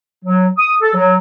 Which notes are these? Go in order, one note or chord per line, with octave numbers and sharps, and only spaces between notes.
F#3
D#6
A4
F#3